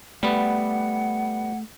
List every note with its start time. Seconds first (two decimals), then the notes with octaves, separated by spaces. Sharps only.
0.23 G3 A3 B3 F#5